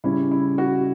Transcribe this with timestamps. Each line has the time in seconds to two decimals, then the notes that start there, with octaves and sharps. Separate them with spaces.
0.04 C#3 G3 C#4 E4
0.31 E4
0.58 F#4